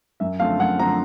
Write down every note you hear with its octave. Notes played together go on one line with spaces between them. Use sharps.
F#2 E5
D3 F3 A3 C4 F5
F#2 F#5
D3 F3 A3 C4 A#5